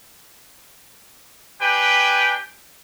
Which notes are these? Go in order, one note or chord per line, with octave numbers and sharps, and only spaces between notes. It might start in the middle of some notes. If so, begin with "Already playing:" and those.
D4 G4 B4 G5 G#5